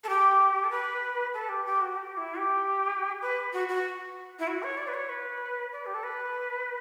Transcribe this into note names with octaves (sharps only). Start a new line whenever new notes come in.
A4
G4
A4
B4
A4
G4
G4
F#4
G4
E4
G4
B4
F#4
F#4
E4
F#4
C#5
D5
B4
C#5
B4
D5
G4
A4
B4